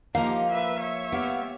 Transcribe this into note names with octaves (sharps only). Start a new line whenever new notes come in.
F3 A#3 D#4 G4 F5
B4 E5
C#5 E5
B3 G4 F5